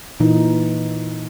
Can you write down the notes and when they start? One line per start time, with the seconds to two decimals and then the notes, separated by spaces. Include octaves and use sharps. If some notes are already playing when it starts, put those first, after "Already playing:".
0.20 A#2 E3 D#4